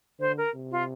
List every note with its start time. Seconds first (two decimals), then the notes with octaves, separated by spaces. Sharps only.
0.20 D3 C5
0.38 A#4
0.54 C3
0.71 F4